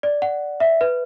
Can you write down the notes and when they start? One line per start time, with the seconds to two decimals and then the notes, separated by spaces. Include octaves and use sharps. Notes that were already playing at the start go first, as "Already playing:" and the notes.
0.03 D5
0.22 F#5
0.60 E5
0.81 B4